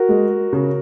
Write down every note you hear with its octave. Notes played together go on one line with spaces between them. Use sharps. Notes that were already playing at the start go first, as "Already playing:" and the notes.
Already playing: F#4 A#4
G#3
C#3